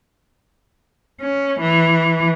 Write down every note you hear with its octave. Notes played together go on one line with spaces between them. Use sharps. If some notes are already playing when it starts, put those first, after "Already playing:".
C#4
E3